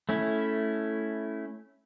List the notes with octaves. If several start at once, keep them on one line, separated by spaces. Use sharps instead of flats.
A3 C#4 E4